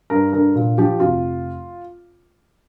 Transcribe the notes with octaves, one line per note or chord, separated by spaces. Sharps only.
G2 A#4
D3 A#4
A#2
F3 G4
F1 F4